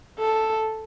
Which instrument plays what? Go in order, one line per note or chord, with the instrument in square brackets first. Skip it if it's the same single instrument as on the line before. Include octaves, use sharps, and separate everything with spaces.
[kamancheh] A4